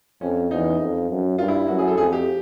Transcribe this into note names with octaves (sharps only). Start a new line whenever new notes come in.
F2 C#4
E2 D#4
F2
F#2
G2 F4
E4
F#2 F#4
G#4
A4
F2 G#4
G4